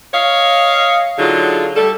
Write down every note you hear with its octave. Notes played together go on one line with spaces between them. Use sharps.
C#5 D#5 F5
D3 F#3 D#4 F4 G#4
G3 A4